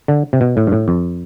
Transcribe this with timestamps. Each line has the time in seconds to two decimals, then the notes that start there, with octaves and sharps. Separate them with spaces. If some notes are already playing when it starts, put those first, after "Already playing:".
0.08 D3
0.33 C3
0.41 B2
0.57 A2
0.67 G2
0.72 A2
0.88 F2